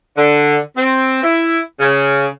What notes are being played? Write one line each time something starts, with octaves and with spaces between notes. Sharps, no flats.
D3
C4
E4
C#3